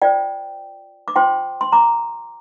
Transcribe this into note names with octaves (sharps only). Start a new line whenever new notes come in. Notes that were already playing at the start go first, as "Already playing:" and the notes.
F4 C5 D5 G5
D6
F4 C5 G5 C6
C6
A#5 D6